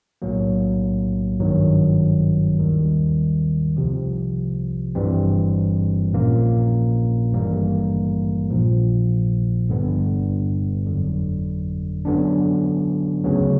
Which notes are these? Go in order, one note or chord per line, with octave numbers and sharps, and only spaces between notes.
B1 A2 F#3 A#3
G#1 G2 D#3 F#3
D#2 D#3 G3
C2 C3 F3
G1 G2 E3 G3 C4
A#1 A#2 F3 A#3 C#4
G#1 G2 E3 G3 A#3
A#1 A#2 F3
G1 G2 D3 G3 B3
G1 F2 D3 F#3
F#2 D3 F#3 B3 D4
D2 C#3 F#3 B3